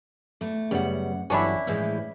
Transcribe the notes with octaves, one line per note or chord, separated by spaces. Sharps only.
E2 A3
F#2 C#3 G3 B3 F#5
G1 E3 F#3 C#4 D4 E4 F#4
A2 E3 F3 G#3 E5